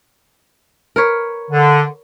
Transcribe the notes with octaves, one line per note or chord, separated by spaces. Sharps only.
A#4 B4 C#5
D3